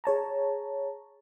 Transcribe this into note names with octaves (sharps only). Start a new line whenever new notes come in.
G#4 C#5 A5 A#5